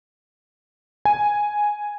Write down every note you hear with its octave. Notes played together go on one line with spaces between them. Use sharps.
G#5